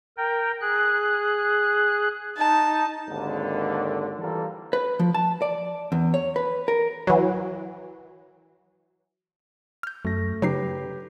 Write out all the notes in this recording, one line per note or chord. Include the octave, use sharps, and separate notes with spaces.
A#4 G5
G#4 F#6
D#4 A5
G#1 D#2 D3
E3 G3 A#3 F4 A4
B4
F3
A5
D5
E2
C#5
B4
A#4
E3 F#3
F6 G6
F#2 A3 A#6
C#3 F#3 D#4 G4 B4 C7